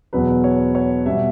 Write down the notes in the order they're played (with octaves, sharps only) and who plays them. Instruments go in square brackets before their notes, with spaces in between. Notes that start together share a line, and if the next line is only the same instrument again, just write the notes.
[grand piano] E2 B2 F#3 B4
C#5
C#5
B2 G3 E5